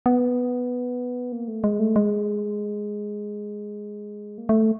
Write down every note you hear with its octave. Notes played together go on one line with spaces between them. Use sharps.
B3
A#3
A3
G#3
A3
G#3
A#3
A3